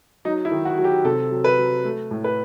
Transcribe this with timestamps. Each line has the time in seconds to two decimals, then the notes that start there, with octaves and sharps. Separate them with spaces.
0.25 F#3 D#4
0.45 E4
0.52 D#3
0.65 F#4
0.78 F#3
0.84 G4
1.05 C3 A4
1.31 F#3
1.44 B4
1.58 F#3
1.84 A3
2.11 A2
2.24 B4